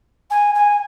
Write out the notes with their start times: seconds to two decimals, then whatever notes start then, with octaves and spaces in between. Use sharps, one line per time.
0.30 G#5
0.54 G#5